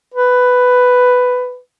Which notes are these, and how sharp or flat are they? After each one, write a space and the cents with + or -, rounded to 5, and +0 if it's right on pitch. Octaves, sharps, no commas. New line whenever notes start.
B4 +10